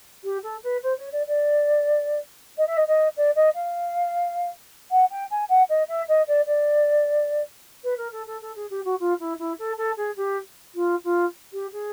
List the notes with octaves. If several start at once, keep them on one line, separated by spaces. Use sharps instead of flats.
G4
A4
B4
C5
C#5
D5
D5
D#5
E5
D#5
D#5
D5
D#5
F5
F#5
G5
G#5
F#5
D#5
E5
D#5
D5
D5
B4
A#4
A4
A4
A4
G#4
G4
F#4
F4
E4
E4
A4
A4
G#4
G4
F4
F4
G4
G#4